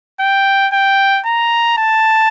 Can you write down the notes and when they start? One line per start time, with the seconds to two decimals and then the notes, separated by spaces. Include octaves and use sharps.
0.20 G5
0.73 G5
1.26 A#5
1.78 A5